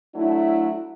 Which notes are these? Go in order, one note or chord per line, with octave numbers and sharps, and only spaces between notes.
F#3 A3 D4 E4